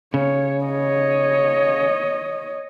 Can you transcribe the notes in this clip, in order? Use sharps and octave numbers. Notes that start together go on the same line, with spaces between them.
C#3 C#5
C#5 D#5